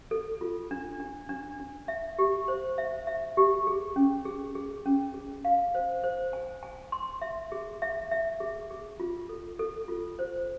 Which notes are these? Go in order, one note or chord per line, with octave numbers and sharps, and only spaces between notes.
A4
F4
D4
D4
D4
D4
E5
G4
C5
E5
E5
G4
G#4
C#4
G#4
G#4
C#4
G#4
F5
C5
C5
G#5
G#5
C6
E5
G#4
E5
E5
G#4
G#4
F4
A4
A4
F4
C5